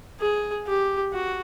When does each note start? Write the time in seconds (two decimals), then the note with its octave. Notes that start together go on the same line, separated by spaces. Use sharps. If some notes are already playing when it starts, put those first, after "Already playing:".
0.20 G#4
0.66 G4
1.13 F#4